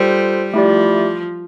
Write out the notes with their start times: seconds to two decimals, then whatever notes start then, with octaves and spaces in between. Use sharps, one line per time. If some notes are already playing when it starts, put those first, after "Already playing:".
Already playing: G3 F4 A4 C5
0.53 F3 A3 E4 G4 D5